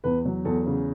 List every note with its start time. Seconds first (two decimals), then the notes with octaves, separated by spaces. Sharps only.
0.04 E2 B4
0.25 F#3
0.45 E2 A4
0.66 C#3